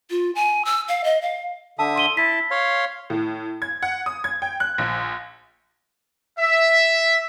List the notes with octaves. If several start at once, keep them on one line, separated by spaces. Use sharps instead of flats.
F4
G#5
E6
F5
D#5
F5
D3 E5 A5 D#6
C6 D#7 G7
E4 A5 B6
C#5 F5 C6
A2
G#6
F#5
D#6
G#6
G5
F#6
A#1
E5